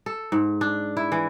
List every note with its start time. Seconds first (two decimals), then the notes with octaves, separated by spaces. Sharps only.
0.06 A4
0.32 G#2
0.61 D4
0.97 E4
1.12 E3